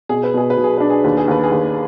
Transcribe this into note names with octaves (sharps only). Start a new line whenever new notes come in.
B2 G#4
B4
B2 G#4
B4
B1
G#4
D4 B4
G#4
D#2 B4
G#4
D#2 B4
G#4
D#2